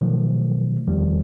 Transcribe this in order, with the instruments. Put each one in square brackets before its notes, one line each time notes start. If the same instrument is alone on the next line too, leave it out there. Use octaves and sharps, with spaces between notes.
[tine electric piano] B2 D#3 F3 F#3 A3
E2 D#3 F3 G3